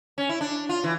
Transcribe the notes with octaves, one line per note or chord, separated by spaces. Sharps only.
C#4
E4
D4
F4
E3